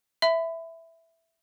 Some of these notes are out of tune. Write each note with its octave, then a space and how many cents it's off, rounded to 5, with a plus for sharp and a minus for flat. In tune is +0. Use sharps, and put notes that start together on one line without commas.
E5 +0 B5 +30